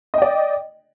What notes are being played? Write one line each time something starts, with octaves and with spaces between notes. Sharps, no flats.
D5 D#5 G5